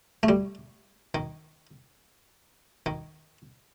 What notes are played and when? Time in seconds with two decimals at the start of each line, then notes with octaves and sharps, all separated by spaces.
0.23 A3
0.29 G3
1.15 D#3
2.86 D#3